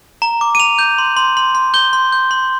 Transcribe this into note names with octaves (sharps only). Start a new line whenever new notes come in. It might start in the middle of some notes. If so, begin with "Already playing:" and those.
A#5
D6
D#7
A#5 F7
G6
C6
C6
C6
C6
G6 G7
C6
G6
C6